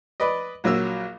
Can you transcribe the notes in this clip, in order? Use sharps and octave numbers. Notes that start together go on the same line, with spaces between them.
B4 D5 D#5
A#1 F#3 A#3 E6